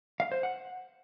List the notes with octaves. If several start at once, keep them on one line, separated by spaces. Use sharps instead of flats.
F5
C5
F#5